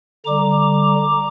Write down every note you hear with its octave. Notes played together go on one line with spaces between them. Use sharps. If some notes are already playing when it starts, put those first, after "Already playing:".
D3 G3 A#5 D6